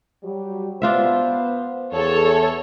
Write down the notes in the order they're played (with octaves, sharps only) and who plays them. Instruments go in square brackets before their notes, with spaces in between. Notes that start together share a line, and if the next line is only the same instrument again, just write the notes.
[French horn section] F#3 G3 G4
[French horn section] B3 C5 [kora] D4 F4 E5
[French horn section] E2 [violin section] A4 C#5